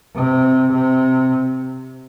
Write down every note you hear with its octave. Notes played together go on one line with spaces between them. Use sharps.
C3
C3